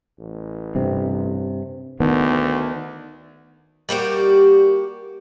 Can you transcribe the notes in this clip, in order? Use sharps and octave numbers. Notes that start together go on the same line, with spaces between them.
A1
G2 C3
D2 D#3 B3
G3 A#3 F#4 G4